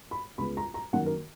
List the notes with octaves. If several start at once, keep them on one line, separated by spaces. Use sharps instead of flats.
B5
C#2 C#3 G#3 B3 B5
A#5
A#5
F#2 D#3 A#3 F#5
A#4